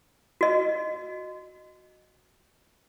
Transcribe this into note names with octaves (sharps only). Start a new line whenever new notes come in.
F#4 D#5